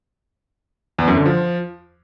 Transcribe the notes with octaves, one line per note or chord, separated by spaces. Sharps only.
E2
F#2
D3
F3